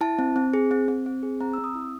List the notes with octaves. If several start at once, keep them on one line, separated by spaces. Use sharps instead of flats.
E4 A5
C4
C4
G#4
C4
C4
C4
G#4
C4 A#5
C4 E6
D#6
E4